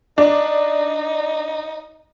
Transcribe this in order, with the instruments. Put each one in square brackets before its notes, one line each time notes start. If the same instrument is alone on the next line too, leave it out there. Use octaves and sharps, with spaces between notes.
[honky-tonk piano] D4 [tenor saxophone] D#4